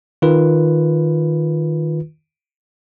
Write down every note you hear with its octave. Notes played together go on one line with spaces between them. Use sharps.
D#3 F4 B4